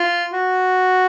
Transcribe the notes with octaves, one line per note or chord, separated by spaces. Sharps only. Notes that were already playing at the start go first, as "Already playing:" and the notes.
Already playing: F4
F#4